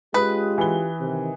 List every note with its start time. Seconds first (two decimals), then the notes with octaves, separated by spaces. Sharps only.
0.14 G#3 C#4 F4 G4 B4 D#6 F#6
0.58 E3 B5 G7
1.00 C3 D#3